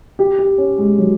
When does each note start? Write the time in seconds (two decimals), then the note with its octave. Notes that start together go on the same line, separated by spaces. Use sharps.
0.19 G4
0.39 G4
0.58 C#4
0.78 G#3
0.98 F#3